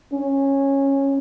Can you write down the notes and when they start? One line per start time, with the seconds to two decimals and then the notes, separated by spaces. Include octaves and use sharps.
0.13 C#4